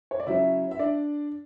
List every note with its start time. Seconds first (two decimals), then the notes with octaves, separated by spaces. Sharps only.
0.11 C#5
0.20 D5
0.27 C#3 F#3 C#4 E4 E5
0.71 E5
0.79 D4 D5